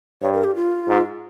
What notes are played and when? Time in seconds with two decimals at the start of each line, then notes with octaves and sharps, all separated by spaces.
0.22 G2 C#5
0.33 A#4
0.44 G4
0.55 F4
0.88 G#2